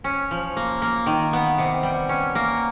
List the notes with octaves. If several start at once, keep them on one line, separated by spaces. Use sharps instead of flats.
C#4
F3
A#3
A#3
D#3
B3
C3
G3
C#4
A#3